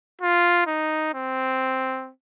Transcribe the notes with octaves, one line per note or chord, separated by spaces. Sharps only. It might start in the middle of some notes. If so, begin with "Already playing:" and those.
F4
D#4
C4